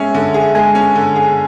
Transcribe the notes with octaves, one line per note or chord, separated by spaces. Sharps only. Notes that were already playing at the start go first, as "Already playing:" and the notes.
Already playing: G#3 C#4 G#4 E5
D3
G#4
G#3 G#5
C#4
D3
G#4